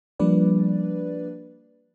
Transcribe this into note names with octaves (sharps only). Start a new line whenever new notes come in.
F3 G3 A#3 D4 B4 D5